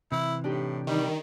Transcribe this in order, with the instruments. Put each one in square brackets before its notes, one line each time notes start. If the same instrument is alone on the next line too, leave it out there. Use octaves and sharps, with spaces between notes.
[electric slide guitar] C3 E3 [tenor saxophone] E4
[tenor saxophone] A2 [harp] D4 D#4 G4
[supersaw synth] D#3 [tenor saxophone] G3